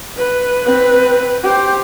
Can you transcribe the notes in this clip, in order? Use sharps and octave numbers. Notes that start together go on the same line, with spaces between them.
B4
C4 B4
G4 C5